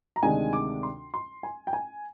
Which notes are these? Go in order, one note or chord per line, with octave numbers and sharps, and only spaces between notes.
A#5
D2 C3 D#3 G#3 D4 G#5
D6
C6
C6
G#5
G5
G#5